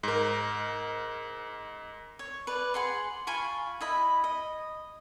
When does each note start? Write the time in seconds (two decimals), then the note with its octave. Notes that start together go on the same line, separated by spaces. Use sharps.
0.03 G#2 A#4
2.19 C#5
2.47 B4 D5
2.74 G#4 F#5 C6
3.27 F4 G#5 B5 C#6
3.81 E4 D#5 B5
4.24 D#5